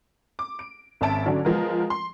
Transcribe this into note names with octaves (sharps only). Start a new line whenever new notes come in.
D6
D7
G#1 C#4 E5 A5 D7
D3 F#3 C#4 D4
F3 G#3 B3 A#4
C6